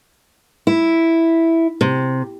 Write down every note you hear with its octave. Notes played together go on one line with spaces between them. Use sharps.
E4
C3